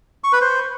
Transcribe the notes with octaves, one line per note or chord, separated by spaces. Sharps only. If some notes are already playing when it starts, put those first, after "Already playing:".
C#6
B4
C5